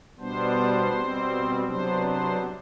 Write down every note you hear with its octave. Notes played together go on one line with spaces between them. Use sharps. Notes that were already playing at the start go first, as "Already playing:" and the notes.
B2 G3 B3 D4 C5
B2 G3 C4
C3 F#3 B3 D4 C5
C5